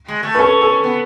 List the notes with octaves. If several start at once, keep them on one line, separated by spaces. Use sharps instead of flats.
G#3
A3
B4
C#4 A4
A4
B3